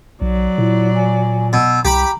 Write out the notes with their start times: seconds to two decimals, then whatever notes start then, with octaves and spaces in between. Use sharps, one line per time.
0.22 B1 F#3 D5
0.58 A#2 E4
0.95 G#5
1.53 B2 E6
1.85 C2 G4 A#5 B5